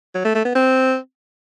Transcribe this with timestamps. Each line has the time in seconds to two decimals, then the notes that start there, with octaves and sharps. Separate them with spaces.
0.15 F#3
0.25 A3
0.35 A3
0.45 B3
0.55 C4